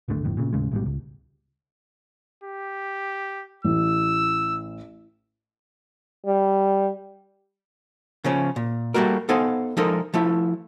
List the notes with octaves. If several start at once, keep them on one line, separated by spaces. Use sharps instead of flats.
D1 G#1 D3 A3
G1 F2 A2
A#2 C#3
D#2 A2 C#3 G#3
A1 G#2 B2 G3
C#2
G4
A1 E6
G3
C#3 F3 C#4
A#2
G3 A3 A#3 F#4 A#4
B3 D#4 A4 C5 F5 G#5
F3 G#3 D#4 A4 A#4
F3 A3 E4